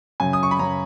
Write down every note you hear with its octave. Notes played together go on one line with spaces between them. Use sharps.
F#2 C#3 G#5
D#6
C#6
B5
F#2 C#3 A#5